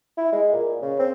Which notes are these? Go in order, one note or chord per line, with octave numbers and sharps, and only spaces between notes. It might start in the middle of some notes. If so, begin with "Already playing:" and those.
E4
G#3
A#2
C#3
C4